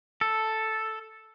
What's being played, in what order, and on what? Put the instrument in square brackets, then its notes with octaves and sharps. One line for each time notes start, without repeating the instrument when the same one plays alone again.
[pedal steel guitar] A4